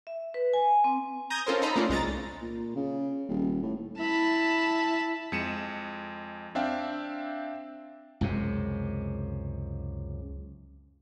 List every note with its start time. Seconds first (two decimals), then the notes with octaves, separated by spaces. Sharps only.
0.07 E5
0.34 B4
0.53 G#5
0.84 C4
1.30 A#5 D#6 G6 G#6 A#6
1.46 C#4 F4 A4 A#4 C5
1.62 D#4 A4 C5 D#5 A#5 B5
1.76 A3 A#3 C#4 D4 F4 D5
1.89 C2 G#3 A#5 A6
2.41 A#2
2.76 C#3
3.29 D#1
3.63 A2
4.00 E4 A5 B5
5.32 F2 G#3 C#7 D#7 E7
6.55 C4 D4 E5 F5 G5
8.21 C#2 F#2 C3